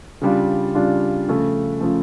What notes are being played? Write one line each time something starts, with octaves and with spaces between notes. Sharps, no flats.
C#3 G3 D4 F4
C#3 G3 D4 F4
C#3 F3 A3
C#3 F3 A3